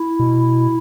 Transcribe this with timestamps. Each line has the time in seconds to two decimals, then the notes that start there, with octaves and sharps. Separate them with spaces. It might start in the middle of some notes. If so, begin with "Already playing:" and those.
Already playing: E4
0.20 B2